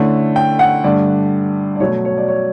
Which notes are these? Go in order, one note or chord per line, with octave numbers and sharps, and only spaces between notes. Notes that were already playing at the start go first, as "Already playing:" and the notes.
Already playing: D3 A3 C#4 E4
G5
F#5
G2 D3 A3 D4 D5
D5
B2 F#3 A3 C#5
C#5
D5
C#5